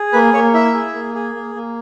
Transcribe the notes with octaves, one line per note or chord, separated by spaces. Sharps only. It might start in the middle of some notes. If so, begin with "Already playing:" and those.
Already playing: G#4
A#3 B4
A#3 C#5
E4 E5
G#4
A#3
G#4
A#3
A#3